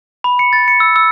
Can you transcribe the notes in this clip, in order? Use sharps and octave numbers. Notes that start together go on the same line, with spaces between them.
B5
C#7
A6
C#7
E6
E6